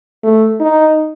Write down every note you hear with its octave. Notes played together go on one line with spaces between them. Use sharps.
A3
D#4